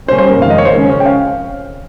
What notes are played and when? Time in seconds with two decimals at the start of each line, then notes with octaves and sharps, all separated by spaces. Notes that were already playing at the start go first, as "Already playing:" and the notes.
0.08 C3 G3 A#3 C#4 C5
0.18 C5
0.29 A#4
0.40 F2 C3 D#3 G#3 F5
0.50 D#5
0.58 C#5
0.65 C5
0.73 F2 C#3 G#3 C#4 A#4
0.90 C5
1.00 G5
1.06 F5